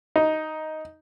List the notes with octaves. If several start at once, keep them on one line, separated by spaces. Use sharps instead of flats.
D#4